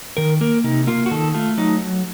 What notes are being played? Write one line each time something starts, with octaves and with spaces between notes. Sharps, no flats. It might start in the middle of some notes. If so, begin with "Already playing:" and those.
D#3 A#4
A#3 A#4
C3 D#4
A#3 F4
F#4
D#3 A4
A3 F4
F#3 D#4